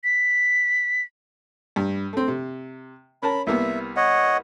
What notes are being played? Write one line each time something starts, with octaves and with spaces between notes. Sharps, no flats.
B6
G2
A3 C4
C3
C#4 A#4 A5 B5
C2 A#3 B3 E5
C#5 D#5 F#5